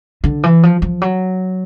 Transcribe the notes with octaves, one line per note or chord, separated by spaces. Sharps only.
D3
E3
F3
F3
F#3